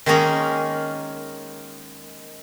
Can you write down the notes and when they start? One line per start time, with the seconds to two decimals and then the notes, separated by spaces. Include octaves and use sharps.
0.06 D#3 G#3 A#3 C#4 G#4 A#4